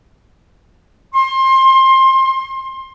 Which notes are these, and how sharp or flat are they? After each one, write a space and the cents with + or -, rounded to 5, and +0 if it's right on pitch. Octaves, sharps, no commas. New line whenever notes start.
C6 +25